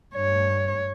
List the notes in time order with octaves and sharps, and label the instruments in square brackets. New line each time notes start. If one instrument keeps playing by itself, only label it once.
[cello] G2 C#5